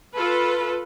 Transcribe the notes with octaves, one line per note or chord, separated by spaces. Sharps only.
F4 A4 B4